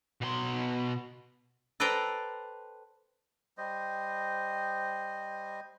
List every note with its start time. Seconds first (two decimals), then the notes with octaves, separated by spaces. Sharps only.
0.21 B2 C6
1.80 A4 B4 C5 D5 G5 A#5
3.58 G3 C5 D#5